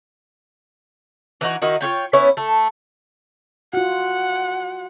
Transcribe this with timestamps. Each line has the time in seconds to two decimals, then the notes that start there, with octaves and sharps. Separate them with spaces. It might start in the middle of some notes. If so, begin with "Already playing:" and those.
1.41 E3 D#4 F#4
1.62 D#3 D#4 E4 F#4
1.81 F4 F#4 C#5 G5
2.13 B3 C#4 E4 C#5
2.37 A3
3.74 F4 F#4 F#5